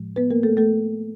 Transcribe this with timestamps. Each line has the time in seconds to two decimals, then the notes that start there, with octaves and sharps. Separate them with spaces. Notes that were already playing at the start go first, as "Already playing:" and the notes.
Already playing: A2 F3 G#3
0.16 B3 B4
0.31 A#3 A#4
0.43 A3 A4
0.57 A3 A4